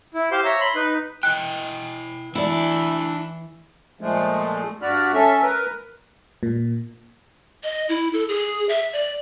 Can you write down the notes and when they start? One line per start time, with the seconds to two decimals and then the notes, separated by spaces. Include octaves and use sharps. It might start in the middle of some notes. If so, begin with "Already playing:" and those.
0.14 E4
0.32 G4 C5 F5 C6
0.45 C#5 E5 A#5
0.61 B5 C6
0.75 D#4 B4
1.23 E4 D#5 G5 F#6
2.35 E3 D4 E4 D5 E5
4.01 A#2 F3 G#3 A3
4.82 G2 F#4 D5 B5 F6
5.14 C#4 A4 E5
5.43 A#4 B4
6.43 A#2
7.63 D#5
7.89 E4
8.13 A4
8.29 G#4
8.69 E5
8.93 D5